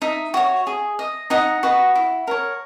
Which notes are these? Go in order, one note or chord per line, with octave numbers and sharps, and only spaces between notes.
D#4 E5
F#4 C#5
G#4
D#5
D#4 D#5 F#5
F#4 B4 D#5
E4
A#4 C#5